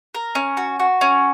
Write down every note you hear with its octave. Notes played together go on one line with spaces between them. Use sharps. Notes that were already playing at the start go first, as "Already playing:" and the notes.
A#4
C#4
F#4
F#4
C#4